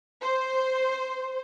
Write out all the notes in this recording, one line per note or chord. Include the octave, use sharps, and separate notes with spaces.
C5